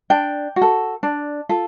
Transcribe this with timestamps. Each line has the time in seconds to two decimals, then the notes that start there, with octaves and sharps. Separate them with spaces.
0.10 D4 G5
0.56 F#4
0.62 A4
1.03 D4
1.49 F4 A4